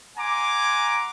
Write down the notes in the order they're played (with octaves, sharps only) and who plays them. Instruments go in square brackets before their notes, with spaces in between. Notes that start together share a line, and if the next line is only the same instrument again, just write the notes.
[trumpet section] F#5 G#5 A#5 C6 D6